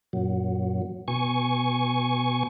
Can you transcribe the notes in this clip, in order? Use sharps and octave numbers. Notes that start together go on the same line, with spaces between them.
F#2 A#2 F#3
B2 G#5 C#6